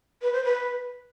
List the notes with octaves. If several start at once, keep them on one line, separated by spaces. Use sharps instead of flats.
B4
C5
B4